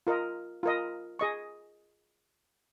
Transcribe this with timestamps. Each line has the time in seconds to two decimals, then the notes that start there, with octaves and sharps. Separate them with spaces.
0.07 F4 A#4 D#5
0.63 F4 A#4 D#5
1.19 G#4 D#5 C#6